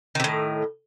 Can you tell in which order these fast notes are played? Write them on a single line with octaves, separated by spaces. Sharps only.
D#3 C3 A2